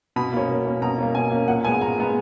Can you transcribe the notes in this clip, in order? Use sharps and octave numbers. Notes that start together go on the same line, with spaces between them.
B2 B5
A#3 C#4
B2
A#3 C#4
B2 A#5
A#3 C#4
B2 G#5
A#3 C#4
A#2 F#5
G#3 B3 G#5
A#2 A#5
G#3 B3